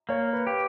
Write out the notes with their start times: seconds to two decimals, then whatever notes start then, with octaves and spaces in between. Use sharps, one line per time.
0.09 A#3 C#5
0.33 B4
0.47 G4